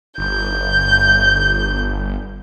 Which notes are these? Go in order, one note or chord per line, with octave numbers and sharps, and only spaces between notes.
G1 G6